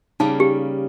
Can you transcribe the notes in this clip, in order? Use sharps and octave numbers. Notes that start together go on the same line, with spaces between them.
C#3 G3 A#3 D#4
G4